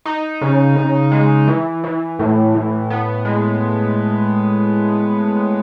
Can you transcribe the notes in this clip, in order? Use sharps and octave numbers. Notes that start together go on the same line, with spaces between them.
D#4
C#3
C#3
G#3
E3
E3
A2
A2
B3
G#3